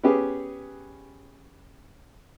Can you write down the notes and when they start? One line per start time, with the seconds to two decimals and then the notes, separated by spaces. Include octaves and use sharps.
0.03 B3 C#4 G4 G#4 B4